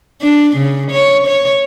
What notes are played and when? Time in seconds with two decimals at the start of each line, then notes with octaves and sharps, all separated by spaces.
0.22 D4
0.57 C#3
0.91 C#5
1.27 C#5